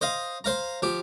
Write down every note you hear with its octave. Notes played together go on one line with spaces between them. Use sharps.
C5 D#5 F5
C5 F5 A#5
F3 G4